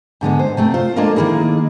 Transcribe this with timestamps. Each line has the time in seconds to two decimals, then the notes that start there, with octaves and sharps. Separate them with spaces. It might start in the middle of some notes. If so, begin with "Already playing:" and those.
0.21 G#2 D3 G#3 B3
0.39 C5
0.57 C3 A3 C4
0.74 F4 C5
0.96 G#3 A#3 D4 F4 A4 A#4
1.16 D#3 F#3 A#3 E4 G#4